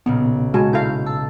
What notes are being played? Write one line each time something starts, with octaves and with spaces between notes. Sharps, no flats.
B1 A#2 C#3 B3
G#3 F#4 G#5 A5
E4 A4 F5 G6
A5 E6